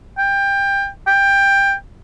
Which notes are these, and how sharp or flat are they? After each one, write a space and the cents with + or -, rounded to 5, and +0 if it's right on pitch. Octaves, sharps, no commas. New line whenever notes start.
G5 +20
G5 +15